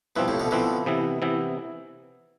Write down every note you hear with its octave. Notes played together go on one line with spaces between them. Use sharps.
G2 B2 F3 C4 E4 B4
A2 C3
B2 D3
B2 D3 F3 C4 E4 B4
C3 E3 B3 E4
C3 E3 B3 E4